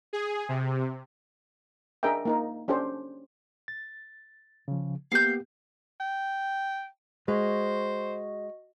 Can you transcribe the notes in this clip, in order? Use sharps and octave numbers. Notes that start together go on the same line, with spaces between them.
G#4
C3
D4 G#4 A#4 D#5 E5 G5
A#3 D#4 A#4
C#4 D4 G4 A4 C5
A6
C#3 F3
A#3 B3 G4 F5 G6
G5
G#3 F#4 C5 D#5